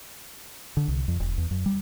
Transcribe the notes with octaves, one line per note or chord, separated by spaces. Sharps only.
D3
C2
F2
E1
E2
F#2
G3